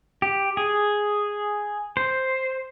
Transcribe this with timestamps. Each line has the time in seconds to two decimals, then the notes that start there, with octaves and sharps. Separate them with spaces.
0.22 G4
0.57 G#4
1.97 C5